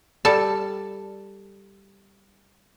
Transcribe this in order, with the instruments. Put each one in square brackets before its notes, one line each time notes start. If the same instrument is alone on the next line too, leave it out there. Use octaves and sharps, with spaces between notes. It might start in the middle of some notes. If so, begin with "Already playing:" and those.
[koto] G3 A4 A5